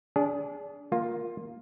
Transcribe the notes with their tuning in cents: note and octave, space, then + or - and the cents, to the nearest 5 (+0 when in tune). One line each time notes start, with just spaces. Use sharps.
D4 -30 G#4 +0
A#3 +0 F4 +10